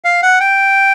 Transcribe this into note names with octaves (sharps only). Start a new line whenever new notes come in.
F5
F#5
G5